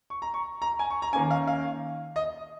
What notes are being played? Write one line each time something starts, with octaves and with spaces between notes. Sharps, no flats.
C#6
A#5
C#6
A#5
G#5
C#6
A#5
D#3 A#3 C#4 G#5
F5
F5
D#5